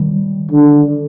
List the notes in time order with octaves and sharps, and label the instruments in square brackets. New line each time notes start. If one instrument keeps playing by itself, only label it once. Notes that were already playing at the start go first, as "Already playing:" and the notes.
Already playing: [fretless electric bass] D#3 G3
[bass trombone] D3